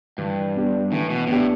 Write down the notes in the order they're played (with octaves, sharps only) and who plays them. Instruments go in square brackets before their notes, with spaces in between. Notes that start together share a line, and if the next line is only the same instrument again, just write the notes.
[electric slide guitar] G2 [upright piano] E3
[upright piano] B3 D4 G4
[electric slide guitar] A2 [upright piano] E3
[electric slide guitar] B2
[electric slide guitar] A2 [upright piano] B3 D4 G4